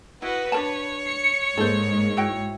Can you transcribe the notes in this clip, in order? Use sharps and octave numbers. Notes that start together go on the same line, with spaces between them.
E4 F#4 B4 D#5
D4 A#4 C#5 A5
C#7
G#2 G#3 A#3 A4 C5
E4 F#4 G5